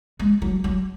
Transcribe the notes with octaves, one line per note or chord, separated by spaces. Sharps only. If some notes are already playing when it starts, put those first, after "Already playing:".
G#3
F#3
F#3